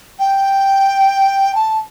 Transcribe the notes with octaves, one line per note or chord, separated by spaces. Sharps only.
G5
A5